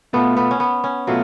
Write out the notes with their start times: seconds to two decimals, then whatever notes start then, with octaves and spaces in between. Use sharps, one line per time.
0.13 B2 A3 B3 F4 A4
0.37 B3
0.51 C#4
0.60 B3
0.84 C#4
1.07 B2 F#3 A3 F4